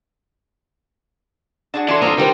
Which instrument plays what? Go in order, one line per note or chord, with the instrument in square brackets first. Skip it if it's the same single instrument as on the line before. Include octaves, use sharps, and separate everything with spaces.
[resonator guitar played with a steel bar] D4 [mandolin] F#4 G#4 A5
[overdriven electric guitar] E3 [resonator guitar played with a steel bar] D4 F#4 A4 [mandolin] A5 C6
[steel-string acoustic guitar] E2 G2 C4 [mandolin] A#3 A#4 [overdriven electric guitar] D#5 F5
[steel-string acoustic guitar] D#3 G4 C5 [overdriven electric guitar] G3 [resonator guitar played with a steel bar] B4 F#5